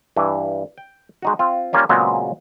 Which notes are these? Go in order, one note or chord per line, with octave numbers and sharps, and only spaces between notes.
G2 E3
G5
G#3 D#4 F#4
C4 F4
G3 A#3 C#4 F4
A#2 C#3 F#3 G#3 B3 C4